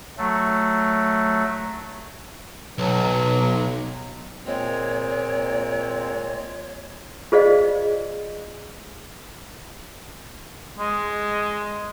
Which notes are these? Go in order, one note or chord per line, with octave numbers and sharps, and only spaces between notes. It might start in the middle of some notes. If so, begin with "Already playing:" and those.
F#3 A3
B1 F#3
A#2 G#3 C4 C#5
F4 G#4 C5 D5 D#5 F5
G#3